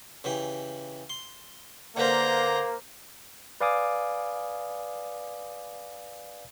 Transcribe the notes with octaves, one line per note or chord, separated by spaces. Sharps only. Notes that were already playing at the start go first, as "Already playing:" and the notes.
C#3 E3 G4
C6
D3 A#3 B4 C5 A#5
B4 D5 F5 G#5 D6 D#6